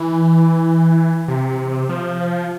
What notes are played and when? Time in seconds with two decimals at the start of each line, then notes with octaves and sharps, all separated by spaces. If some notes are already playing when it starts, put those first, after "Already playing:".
Already playing: E3
1.28 C3
1.89 F3